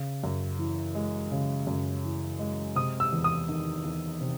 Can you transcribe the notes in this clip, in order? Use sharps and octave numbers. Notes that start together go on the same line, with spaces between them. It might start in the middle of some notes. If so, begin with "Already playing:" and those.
Already playing: C#3
F#2
E3
G#3
C#3
F#2
E3
G#3
C3 D#6
E6
E2
D#6
D#3
E2
C3